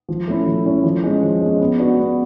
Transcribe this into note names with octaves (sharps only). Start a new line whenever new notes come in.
F3
A3 C#4 E4
F3
A3 C#4 E4
F3
G#3 C#4
F3
G#3 C#4
B3
D4 F#4 B4
B3